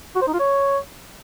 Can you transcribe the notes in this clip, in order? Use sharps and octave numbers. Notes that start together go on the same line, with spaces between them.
F#4
C5
D#4
F4
C#5